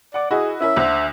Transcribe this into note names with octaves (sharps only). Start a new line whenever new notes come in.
D5 F#5 D6
E4 F#4 G#4 D#5
C#4 E4 A#4 E5
D2 D3 C5